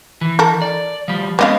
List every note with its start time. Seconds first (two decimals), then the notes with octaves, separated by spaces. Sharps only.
0.21 E3
0.39 A4 A#4
0.62 D5
1.08 F3 G3
1.39 C#3 G#3 B3 C4 D#5 F5